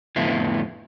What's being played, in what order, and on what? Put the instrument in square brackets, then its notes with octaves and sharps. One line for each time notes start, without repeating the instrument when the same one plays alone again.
[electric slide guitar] F2 A2 D3 B3 E4 F4